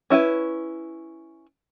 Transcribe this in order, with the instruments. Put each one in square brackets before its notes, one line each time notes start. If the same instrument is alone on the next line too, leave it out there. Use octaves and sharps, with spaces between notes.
[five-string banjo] C#4 E4 F4 B4